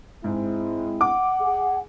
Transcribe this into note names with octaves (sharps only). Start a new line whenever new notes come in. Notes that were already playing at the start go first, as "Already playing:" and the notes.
G#2 G#3 C4 E4
F#5 D6
G#4